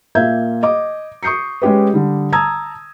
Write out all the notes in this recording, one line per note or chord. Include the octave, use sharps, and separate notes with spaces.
A#2 A#3 E5 G6 G#6
D#5 D6
C#6 D#6 G6 C7 C#7
G#3 C#4 G4 B4
D3 G3
A5 A#5 D#6 E6 G#6